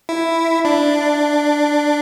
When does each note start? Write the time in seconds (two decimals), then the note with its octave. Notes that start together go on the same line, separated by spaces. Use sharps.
0.09 E4
0.65 D4